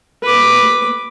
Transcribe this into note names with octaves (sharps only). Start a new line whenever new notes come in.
B4 D6